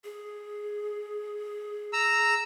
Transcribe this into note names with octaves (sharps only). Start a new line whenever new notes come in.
G#4
A#5 E6